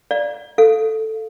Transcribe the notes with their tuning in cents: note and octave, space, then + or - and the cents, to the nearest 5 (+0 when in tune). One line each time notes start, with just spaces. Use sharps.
D5 +0 F5 +0 A#5 +30
A4 +0 F5 +0